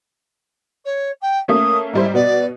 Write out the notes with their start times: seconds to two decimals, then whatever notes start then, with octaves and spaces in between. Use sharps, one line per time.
0.85 C#5
1.21 G5
1.48 A3 A#3 C#4 D#6
1.93 G#2 G3 E4 C5
2.14 B2 B3 D5